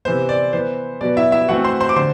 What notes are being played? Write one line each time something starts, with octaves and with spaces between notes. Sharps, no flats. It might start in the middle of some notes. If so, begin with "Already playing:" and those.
C3 E3 B3 C5
D5
E3 B3 C5
B2 F#3 B3 D5
E4 E5
E4 E5
E3 A3 C4 F#4 F#5
C5 C6
C5 C6
D6
D3 C5 C6